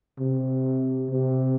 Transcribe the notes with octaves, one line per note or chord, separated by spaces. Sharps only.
C3
C3